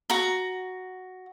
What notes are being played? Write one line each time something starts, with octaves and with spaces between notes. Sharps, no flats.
F#4 A#5